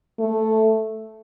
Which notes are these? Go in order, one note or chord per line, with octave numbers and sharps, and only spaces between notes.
A3